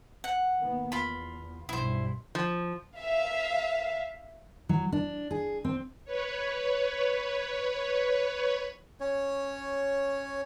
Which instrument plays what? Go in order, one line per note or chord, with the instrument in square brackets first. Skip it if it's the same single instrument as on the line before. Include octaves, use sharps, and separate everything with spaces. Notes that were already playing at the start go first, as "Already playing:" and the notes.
[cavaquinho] F#5
[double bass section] D#3 A#3 B3
[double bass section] E2 [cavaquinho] F4 B5
[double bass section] B1 G2 [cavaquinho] E4 C5
[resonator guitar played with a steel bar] F3
[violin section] E5 F5
[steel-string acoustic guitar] F#3
D4
G#4
C4
[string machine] B4 C#5
[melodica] C#4 C#5